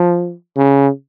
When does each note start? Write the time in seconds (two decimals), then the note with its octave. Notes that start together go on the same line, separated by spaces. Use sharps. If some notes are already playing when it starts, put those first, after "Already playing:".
Already playing: F3
0.57 C#3